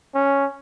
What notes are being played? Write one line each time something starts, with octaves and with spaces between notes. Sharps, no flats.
C#4